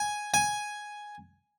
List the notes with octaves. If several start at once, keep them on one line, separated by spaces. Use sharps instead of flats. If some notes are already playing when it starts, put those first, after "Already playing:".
Already playing: G#5
G#5